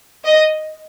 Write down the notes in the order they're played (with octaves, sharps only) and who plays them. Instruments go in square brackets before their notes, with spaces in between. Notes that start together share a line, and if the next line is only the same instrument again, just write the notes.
[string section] D#5